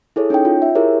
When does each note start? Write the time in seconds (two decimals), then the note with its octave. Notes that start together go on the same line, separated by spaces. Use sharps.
0.16 E4 G#4 A4 C#5
0.30 C#4 D#4 C#5 G5
0.45 F4
0.62 E5
0.75 E4 G4 G#4 A#4 C#5